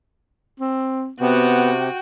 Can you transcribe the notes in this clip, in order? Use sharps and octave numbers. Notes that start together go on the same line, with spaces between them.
C4
C3 B3 F#4 G5